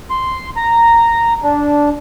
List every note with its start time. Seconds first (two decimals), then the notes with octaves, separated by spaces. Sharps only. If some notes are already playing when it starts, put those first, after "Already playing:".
0.10 C6
0.56 A#5
1.43 D4